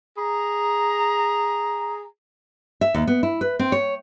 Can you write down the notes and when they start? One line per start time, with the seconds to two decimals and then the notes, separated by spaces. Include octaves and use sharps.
0.17 G#4 A#5
2.81 E5
2.94 D#2
3.07 B3
3.23 E4
3.41 B4
3.59 C4
3.72 C#5